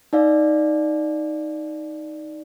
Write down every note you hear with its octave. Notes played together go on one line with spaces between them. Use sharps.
D#4 D5 F5